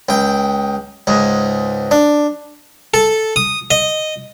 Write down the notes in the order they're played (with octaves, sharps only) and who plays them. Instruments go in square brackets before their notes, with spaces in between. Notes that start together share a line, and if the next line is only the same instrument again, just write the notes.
[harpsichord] C#2 G5
C#2 G#2
D4
A4
D#6
D#5